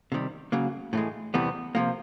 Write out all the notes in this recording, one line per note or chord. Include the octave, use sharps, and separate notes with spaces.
C3 D#3 G3
C#3 F#3 A#3
A2 E3 G#3
E2 C3 E3 G3 B3
C3 F3 A#3